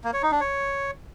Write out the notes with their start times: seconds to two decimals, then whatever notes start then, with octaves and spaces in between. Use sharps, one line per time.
0.04 A#3
0.13 C#5
0.22 D#4
0.32 D4
0.41 C#5